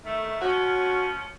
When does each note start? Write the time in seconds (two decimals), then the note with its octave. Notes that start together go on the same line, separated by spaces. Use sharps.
0.04 D#3 A3
0.41 F3 C#4 F#4